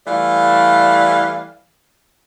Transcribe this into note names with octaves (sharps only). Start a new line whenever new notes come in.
E3 G3 A3 D5 F5